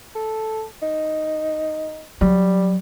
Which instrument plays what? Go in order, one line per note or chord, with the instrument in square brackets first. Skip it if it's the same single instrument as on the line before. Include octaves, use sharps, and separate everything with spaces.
[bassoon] A4
D#4
[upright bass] F#3 [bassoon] G3